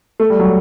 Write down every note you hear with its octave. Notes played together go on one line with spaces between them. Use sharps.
A3
G3
F#3